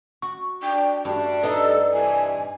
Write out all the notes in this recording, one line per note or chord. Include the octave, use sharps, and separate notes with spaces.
F#4 C#6
D4 G5
G2 G3 A3 D4 F#4
D#4 A4 B4 D5 D#5
G2 C3 E3 G#5